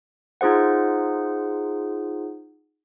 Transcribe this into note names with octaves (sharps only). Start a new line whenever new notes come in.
D#4 F4 G#4 C5 F#5